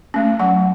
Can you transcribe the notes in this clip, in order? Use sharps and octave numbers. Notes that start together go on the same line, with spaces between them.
A3 C#4
F#3 F#5